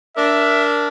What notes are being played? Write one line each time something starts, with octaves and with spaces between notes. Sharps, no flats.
D4 A#4 E5